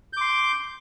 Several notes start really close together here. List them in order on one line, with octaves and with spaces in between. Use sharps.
G6 D6 C6